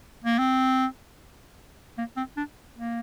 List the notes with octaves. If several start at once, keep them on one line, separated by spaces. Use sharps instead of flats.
A#3
C4
A#3
C4
D4
A#3